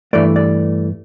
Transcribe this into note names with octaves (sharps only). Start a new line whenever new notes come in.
G2 E3 A3 D5
D5